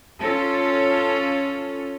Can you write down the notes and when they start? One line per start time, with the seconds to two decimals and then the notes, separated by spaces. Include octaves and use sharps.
0.23 C#4 F4 A4